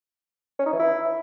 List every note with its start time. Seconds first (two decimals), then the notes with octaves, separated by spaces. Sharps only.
0.59 C#4
0.66 D#4
0.73 E3
0.79 E4